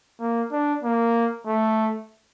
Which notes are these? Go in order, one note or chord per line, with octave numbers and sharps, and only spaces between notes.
A#3
D4
A#3
A3